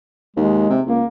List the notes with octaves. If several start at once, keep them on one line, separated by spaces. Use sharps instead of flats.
D#2 G#3
C3
C#2 A#3